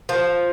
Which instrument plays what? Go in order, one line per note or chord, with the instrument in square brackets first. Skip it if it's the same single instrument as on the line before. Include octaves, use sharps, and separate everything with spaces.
[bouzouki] F3